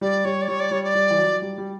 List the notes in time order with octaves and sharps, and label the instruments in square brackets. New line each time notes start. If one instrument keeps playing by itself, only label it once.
[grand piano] G3 [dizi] D5
[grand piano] G3 [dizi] C#5
[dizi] D5
[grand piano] G3 [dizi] C#5
[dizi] D5
[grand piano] G3 [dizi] C#5
[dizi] D5
[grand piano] G3
E3
F#3
G3
G3